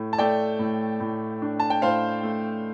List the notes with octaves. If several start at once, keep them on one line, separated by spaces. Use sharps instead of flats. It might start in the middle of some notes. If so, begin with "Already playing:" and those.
Already playing: A2 A3
A5
A3 D5 G5
A2
A2
D4
A5
G5
A2 C5 F5
A3